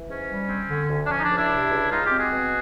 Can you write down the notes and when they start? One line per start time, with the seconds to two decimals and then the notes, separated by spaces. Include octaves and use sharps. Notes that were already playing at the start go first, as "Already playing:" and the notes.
Already playing: E3
0.08 G#2 C#4
0.29 G3
0.48 C4
0.69 D3
0.89 D2
1.05 D4
1.10 F3 C#4
1.19 D#4
1.23 D4
1.30 C#2
1.37 D4 E4
1.50 C3
1.70 C#2
1.90 G#3 D#4 F4
2.04 F4 G4
2.11 C4
2.17 F#4 G#4
2.31 B2